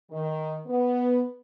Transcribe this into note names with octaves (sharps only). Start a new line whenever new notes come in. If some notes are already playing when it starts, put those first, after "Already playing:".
D#3
B3